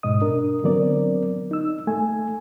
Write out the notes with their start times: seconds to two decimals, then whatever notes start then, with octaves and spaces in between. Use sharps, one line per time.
0.03 G#2 B2 D#5 D#6
0.22 D4 A#4
0.64 D3 F#3 B3 C4 A#4 D5
1.51 D#4 E6
1.87 A3 G#5